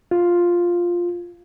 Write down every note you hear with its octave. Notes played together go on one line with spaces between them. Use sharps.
F4